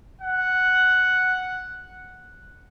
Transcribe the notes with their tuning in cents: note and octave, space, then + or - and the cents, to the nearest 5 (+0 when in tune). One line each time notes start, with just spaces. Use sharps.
F#5 +0